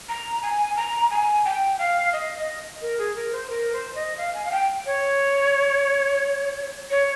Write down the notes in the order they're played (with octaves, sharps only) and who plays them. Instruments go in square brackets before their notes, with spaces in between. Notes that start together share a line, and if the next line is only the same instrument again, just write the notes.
[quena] A#5
G#5
A#5
G#5
G5
F5
D#5
D#5
A#4
G#4
A#4
C5
A#4
C5
D#5
F5
G#5
F5
G5
C#5
C#5